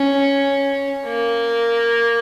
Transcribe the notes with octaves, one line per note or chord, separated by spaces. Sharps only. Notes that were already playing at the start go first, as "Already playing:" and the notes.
Already playing: C#4
A#3